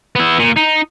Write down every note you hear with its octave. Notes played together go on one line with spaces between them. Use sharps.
B3 E4
A#2
D#4